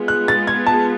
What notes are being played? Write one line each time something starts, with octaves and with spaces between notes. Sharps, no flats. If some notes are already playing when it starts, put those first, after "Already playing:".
Already playing: G#3 B3 F4 G#4
F#6
A6
G#6
A5